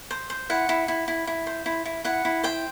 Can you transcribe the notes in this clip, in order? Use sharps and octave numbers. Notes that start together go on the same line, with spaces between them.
C5
C5
E4 F#5
E4
E4
E4
E4
C5
E4
E4
E4 F#5
E4
C5 G5